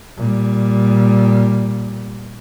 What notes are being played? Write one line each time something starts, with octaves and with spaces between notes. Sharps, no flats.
A#2 G3